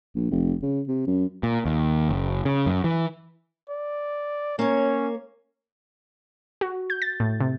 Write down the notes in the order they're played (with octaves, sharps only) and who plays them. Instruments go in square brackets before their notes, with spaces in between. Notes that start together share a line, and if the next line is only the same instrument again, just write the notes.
[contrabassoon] A#1
F1
C#3
C3
F#2
[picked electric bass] A#2
D#2
F#1
C#3
F#2
E3
[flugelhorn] D5
[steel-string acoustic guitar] A#3 C#5 [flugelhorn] C#4
[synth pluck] F#4
G6
A6
A2
C3